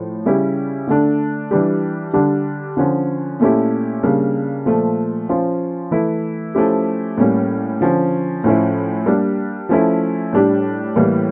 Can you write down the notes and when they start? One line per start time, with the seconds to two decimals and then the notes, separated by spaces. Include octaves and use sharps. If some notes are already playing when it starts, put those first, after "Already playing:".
Already playing: A2 F3
0.26 C#3 G3 C#4 E4 G4
0.87 D3 A3 D4
1.51 E3 G3 D4 G4
2.14 D3 G3 D4 G4
2.77 D3 F3 C#4
3.40 A#2 A3 C#4 E4 G4
4.03 C#3 G3 A#3 D4
4.66 A#2 F3 A3
5.29 F3 C#4 F4
5.91 E3 A3 E4
6.54 F3 A3 C#4 E4 G4
7.18 A2 G3 A#3 C#4
7.81 D3 F3 C#4
8.44 A2 F3 C#4 E4
9.06 G3 A#3 D4 G4
9.69 F3 A3 C#4 E4
10.33 A2 G3 D4 G4
10.96 A2 E3 G3 A#3